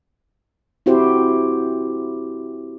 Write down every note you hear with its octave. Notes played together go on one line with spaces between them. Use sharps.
C4 E4 F#4 G4 C5